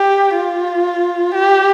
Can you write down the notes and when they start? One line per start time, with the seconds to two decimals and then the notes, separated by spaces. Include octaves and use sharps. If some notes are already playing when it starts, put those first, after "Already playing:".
Already playing: G4
0.36 F4
1.34 G4